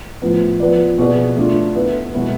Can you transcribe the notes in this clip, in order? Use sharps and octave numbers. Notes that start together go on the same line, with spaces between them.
A2 F3 B3
F3 B3 F4 B4 D5
B2 B3 E4 G#4 D5
A3 D4 F4
B3 E4 B4
B2 G#3 B3 E4 B4